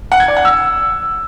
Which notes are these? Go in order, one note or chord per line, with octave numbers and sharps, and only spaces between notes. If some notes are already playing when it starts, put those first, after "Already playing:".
F#5
G#6
D5
F#5
E6